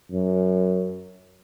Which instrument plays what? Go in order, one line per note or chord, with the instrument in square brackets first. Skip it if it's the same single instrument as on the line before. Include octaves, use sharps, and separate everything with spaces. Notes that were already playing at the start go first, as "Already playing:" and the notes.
[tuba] F#2